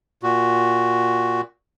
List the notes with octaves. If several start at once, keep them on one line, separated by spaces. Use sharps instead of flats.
A#2 F#4